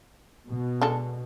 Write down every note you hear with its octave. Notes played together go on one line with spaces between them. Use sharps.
B2
G#3 D4 A4